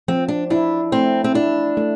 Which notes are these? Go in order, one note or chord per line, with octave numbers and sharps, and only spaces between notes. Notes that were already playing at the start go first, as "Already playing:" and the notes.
F3 C4
D4
D4 E4
A3 C4
C4
D4 E4
A3